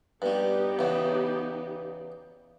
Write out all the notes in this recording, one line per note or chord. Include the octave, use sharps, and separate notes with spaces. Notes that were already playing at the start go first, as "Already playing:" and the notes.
G2 G3 B3 D#4 G4
E2 C#3